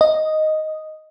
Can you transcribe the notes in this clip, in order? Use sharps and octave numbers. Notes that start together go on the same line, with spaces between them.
D#5